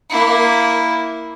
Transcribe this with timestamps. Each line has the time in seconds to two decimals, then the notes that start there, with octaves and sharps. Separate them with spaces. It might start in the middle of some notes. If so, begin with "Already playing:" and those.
0.10 A#3 E4